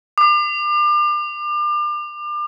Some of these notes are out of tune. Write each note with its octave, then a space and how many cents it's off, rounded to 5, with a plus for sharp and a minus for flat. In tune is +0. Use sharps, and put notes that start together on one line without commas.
D6 +35